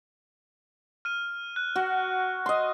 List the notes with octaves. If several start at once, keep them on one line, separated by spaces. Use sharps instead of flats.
F6 D#7
F#6
F#4
D#5 C6